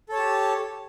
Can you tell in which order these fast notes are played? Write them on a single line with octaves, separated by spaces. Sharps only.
A4 C#5 A5 G4